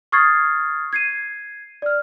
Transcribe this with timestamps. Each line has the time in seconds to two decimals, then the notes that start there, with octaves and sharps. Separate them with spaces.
0.12 C#6 D#6 F6 G#6 A6 C7
0.93 G#6 C7 D#7
1.82 D5 F6